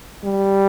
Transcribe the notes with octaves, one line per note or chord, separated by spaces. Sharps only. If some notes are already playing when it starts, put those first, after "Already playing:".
G3